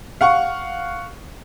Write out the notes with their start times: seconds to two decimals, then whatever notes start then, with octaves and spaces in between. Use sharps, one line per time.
0.21 F5 F#5 C#6